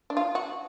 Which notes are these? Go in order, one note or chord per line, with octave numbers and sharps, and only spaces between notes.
D4
F4
F#4